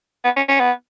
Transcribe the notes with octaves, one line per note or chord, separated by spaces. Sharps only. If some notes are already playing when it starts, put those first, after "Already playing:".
B3
C#4
C#4
B3